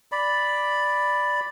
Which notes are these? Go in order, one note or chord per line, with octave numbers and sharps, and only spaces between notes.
D5 B5